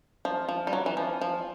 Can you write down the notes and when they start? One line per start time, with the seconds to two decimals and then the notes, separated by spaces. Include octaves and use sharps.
0.25 F3
0.49 F3
0.67 G3
0.73 F#3
0.86 E3
0.97 F3
1.21 F3